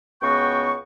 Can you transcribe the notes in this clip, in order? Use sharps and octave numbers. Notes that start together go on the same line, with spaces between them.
C#2 C#3 B3 F#4 G5 C#6